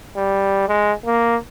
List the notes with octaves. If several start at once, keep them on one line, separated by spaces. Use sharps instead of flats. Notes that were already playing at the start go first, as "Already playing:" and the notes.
G3
G#3
A#3